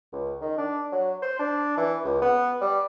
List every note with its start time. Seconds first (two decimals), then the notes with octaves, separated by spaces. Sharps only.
0.13 C#2
0.41 D#3
0.58 D4
0.92 F#3
1.22 C5
1.39 D4
1.77 E3
2.04 C#2
2.22 B3
2.61 G3